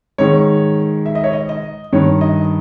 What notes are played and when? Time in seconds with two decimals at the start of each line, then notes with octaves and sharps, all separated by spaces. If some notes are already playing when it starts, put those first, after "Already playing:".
0.18 G#2 D#3 C#5
1.06 E5
1.15 D#5
1.24 C#5
1.33 D#5
1.49 D#5
1.92 G2 D#3 C#5
2.21 D#5